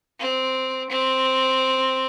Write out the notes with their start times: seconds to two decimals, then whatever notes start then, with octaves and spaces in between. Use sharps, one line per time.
0.19 C4
0.90 C4